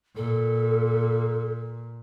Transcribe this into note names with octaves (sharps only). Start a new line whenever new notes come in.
A#2 A4